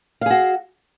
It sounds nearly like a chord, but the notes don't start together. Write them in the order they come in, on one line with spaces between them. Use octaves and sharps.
F5 G#4 F#4